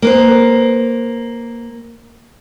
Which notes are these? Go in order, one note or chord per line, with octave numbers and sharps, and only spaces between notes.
A#3 B4 C5